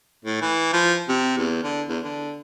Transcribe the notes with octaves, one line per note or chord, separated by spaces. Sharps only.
A2
E3
F3
C3
E2
D3
E2
D3